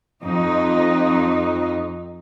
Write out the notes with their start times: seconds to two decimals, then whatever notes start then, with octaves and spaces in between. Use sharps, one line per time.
0.22 F2 D#4